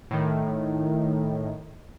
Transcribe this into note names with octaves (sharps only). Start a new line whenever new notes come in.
A2 D#3